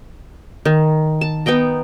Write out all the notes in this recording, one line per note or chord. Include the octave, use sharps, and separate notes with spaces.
D#3
A5
B3 D#4 G5 A#5